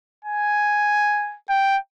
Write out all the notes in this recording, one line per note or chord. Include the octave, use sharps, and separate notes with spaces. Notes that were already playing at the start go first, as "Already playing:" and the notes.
G#5
G5